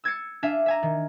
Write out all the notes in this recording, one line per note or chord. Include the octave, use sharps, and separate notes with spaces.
E6 G#6 A6 C#7
D4 E5 F5 G#5
E5 G#5 A#5
D#3